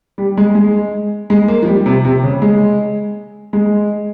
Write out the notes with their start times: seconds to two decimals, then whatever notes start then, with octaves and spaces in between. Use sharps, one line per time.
0.18 G3
0.37 G#3
0.55 G#3
1.30 G#3
1.48 A#3
1.62 F3
1.67 G3
1.86 C3
2.05 C3
2.24 C#3
2.42 G#3
3.53 G#3